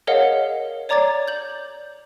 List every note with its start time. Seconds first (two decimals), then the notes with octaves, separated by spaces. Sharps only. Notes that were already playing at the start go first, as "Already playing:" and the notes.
0.07 G#4 A#4 C#5 D#5 F5 F#5
0.89 C#5 D5 A#5 D6 G#6 A6
1.28 G6 F#7